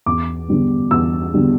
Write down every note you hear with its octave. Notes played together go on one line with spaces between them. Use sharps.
E2 D6
D3 G3 B3
E2 E6
D3 G3 B3